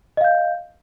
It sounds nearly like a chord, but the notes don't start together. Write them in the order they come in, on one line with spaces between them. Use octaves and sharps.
D#5 F5 G6